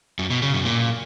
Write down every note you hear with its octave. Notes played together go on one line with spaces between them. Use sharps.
F#2
B2
C#3
F#2
A#2